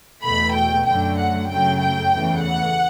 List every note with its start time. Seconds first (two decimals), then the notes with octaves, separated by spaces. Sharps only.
0.25 E2 B2 A3 B5
0.56 G5
0.87 F#2 D3 F#3 A3 G5
1.18 F#5
1.50 F#2 C#3 F#3 A3 G5
1.82 G5
2.13 E2 C#3 E3 A3
2.44 F#5